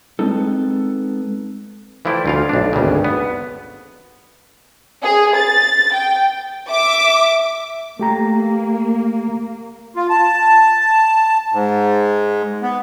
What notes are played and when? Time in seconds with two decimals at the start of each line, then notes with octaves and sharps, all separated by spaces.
0.19 G#3 B3 C4 D#4 A4
2.05 E3 F3 A3 E4 D5 G5
2.26 D2 F4 F5
2.49 B1 D4
2.73 G#1 D2 G2 C#3
3.04 B3
5.03 G#4
5.37 A6
5.94 G5
6.69 E5 D6
7.99 A3 A#3 G4 A#5
9.96 F4
10.10 A5
11.53 G#2
12.63 B3